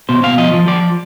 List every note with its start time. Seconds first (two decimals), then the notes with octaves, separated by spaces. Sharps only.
0.09 B2 C5
0.23 B2 F5
0.38 F3 D#5
0.54 F3
0.68 F3 D5